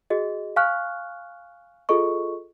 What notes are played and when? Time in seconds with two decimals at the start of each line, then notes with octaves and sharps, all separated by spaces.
0.10 F#4 G#4 D#5
0.56 F5 G#5 C#6 F6 F#6
1.89 F4 G#4 A4 D#5 C#6